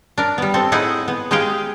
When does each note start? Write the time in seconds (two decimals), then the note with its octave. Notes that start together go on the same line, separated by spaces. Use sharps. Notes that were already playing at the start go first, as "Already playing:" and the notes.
0.18 D4 A#4
0.38 G3 B3
0.54 C4 A4
0.72 A2 D#4 E4 G#4 F#5 G#5
1.08 B3
1.31 G#3 D#4 G4 G#4 F5 G5